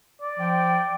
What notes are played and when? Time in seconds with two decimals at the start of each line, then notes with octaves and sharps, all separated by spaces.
0.22 D5
0.39 F3 G5